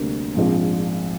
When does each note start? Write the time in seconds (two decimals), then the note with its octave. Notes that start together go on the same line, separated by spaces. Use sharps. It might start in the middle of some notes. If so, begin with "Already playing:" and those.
Already playing: D2 C3 G3 A#3
0.34 A#1 G#2 F3 C4